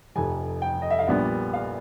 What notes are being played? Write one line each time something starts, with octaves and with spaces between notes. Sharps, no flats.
F1 F2 C3 G#5
G5
D#5
E5
F5
A#1 A#2 G3 B3 D4 F#5
F5